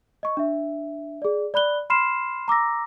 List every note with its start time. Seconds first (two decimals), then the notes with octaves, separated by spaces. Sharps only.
0.23 D#5 C#6
0.37 D4 E5
1.22 G#4 D5
1.54 D5 B5 F#6 G7
1.90 B5 C6 F6 C7 E7
2.48 A#5 D6 E6 A#6